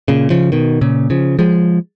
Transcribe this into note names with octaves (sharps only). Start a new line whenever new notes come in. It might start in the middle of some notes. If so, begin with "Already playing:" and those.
A#2 C#3
C#3 F3
B2 D#3
A#2 C#3
C#3 F3
F3 G#3